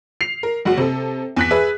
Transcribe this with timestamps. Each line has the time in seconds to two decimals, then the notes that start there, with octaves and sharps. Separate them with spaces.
0.21 C7 F7
0.43 A#4
0.65 F#1 F#4
0.77 C3 A4
1.37 E2 F#6 B6
1.51 G#4 B4 E5